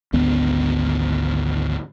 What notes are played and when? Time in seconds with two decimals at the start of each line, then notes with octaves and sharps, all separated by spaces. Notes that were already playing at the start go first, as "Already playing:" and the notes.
0.13 G#1 D2 B3 C#4